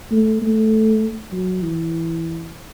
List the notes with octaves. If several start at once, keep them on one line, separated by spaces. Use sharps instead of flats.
A3
A3
F#3
E3